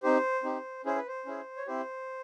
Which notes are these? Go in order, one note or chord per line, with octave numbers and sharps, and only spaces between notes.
C4 D#4 G4 C5
C4 D#4 G4
C#4 E4 G#4 C5
B4
C5
C#4 E4 G#4
C#5
C4 E4 G4 C5